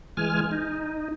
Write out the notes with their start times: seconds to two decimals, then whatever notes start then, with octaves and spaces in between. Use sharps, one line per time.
0.17 E3 G#3 G#5 F6
0.51 D#4